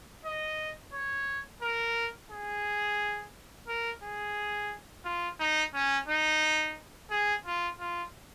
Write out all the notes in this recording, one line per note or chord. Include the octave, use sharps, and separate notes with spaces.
D#5
C#5
A#4
G#4
A#4
G#4
F4
D#4
C#4
D#4
G#4
F4
F4